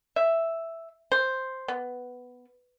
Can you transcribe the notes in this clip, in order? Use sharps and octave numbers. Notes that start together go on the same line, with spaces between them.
E5
C5
B3